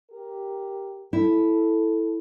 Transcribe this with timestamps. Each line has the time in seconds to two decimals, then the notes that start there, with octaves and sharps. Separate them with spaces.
0.11 G4 A#4
1.13 E4 A4